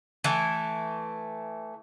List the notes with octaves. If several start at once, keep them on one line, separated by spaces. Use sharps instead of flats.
E3 A3